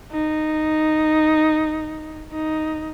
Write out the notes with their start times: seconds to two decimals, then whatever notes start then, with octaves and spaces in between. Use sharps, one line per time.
0.12 D#4
2.32 D#4